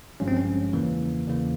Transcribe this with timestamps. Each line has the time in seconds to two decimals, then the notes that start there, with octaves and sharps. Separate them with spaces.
0.20 G#1 G2 F3 G#3 C#4
0.28 C4
0.37 C#4
0.73 E2 C#3 E3 A#3
1.28 E2 C#3 E3 A#3